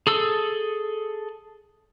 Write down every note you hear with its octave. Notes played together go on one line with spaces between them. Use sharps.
G#4 A4 E6